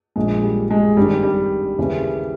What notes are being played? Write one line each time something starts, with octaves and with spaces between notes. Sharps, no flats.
A#1 A#2 G#3
G3
G#3
G#1 G2 D#3 G3
G3
D#2 C#3 E3